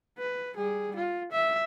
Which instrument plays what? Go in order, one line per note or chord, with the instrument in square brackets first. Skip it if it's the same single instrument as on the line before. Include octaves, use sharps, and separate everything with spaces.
[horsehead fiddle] B4
G3 G#4
F4
E5